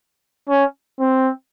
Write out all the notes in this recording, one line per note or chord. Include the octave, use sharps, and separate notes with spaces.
C#4
C4